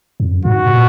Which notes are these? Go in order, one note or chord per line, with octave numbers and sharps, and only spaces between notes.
F2
F#2
G#2 F#4
C3
A#2